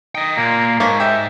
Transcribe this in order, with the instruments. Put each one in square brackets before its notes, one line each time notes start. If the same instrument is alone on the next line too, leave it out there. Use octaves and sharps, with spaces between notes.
[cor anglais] D#4 [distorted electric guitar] D#5 G5
[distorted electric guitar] A#2 [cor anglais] A#3
[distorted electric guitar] G#2 [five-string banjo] A#3 A5 [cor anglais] C#5
[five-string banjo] G4 [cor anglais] E5